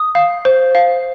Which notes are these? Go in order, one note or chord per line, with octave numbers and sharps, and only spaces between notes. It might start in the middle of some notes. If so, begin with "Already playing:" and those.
Already playing: D#6
F5
C5
F5